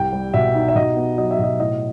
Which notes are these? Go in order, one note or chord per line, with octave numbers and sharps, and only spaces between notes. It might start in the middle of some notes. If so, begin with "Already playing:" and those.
Already playing: C2 G5
G3
B2 E5
D#4
E5
B2 D#5
B3
F#3 D#5
E5
B2
D#5
A2 D#5